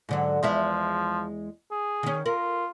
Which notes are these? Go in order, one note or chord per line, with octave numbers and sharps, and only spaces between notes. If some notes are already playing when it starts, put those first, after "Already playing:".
G#2 D3 F#3
E2 F3 G#3 E5
G#4
D#3 C#4
F4 A#4